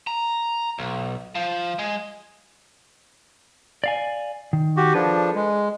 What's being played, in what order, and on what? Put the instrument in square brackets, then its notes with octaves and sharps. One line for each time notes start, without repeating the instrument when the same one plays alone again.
[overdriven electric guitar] A#5
B1
F3
G#3
[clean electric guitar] D5 F5 G#5
D#3
[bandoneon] F#4 G4
[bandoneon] F3 D4 [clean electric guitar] G#4 A4 B4
[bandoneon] G#3